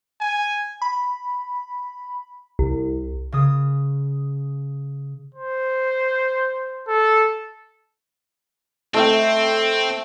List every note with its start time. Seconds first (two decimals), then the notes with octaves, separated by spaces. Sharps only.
0.20 G#5
0.82 B5
2.59 C2
3.32 C#3 D#6
5.35 C5
6.87 A4
8.94 A3 C4 E5 G5